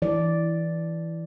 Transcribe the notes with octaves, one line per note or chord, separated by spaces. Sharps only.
E3 D5